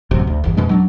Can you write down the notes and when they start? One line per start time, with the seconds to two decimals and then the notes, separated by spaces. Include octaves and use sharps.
0.11 A1 F#2 C3
0.27 D2
0.44 G1 E2
0.57 F2 B2 G#3 D4
0.69 F#3 C#4 D4